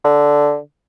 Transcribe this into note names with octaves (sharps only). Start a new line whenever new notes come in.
D3